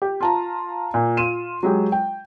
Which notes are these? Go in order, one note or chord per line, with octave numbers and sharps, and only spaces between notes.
G4
F4 A5 A#5
A#2
F4 D#7 E7
F#3 G#3 G4
G5